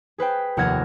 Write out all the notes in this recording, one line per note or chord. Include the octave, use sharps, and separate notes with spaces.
G#4 B4 C5 G5
F1 D#2 F#5 F6 G#6 A#6